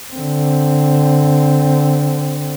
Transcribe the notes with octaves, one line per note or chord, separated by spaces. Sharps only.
D3 C4